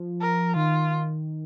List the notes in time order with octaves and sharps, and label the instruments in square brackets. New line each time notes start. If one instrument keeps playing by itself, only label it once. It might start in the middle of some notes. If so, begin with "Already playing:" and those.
Already playing: [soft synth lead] F3
[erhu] A#4
[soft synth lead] D#3 [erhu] F4